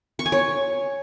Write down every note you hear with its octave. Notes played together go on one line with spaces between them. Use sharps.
C#6
G#5
C#5